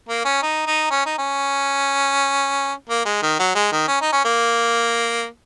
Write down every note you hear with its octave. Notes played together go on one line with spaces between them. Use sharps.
A#3
C#4
D#4
D#4
C#4
D#4
C#4
A#3
G#3
D#3
F#3
G#3
D#3
C#4
D#4
C#4
A#3